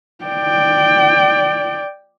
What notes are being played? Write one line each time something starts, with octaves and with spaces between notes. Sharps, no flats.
D5 G5